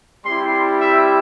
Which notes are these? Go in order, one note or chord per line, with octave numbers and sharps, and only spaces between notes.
G3 C4 E4 G4 C6
E5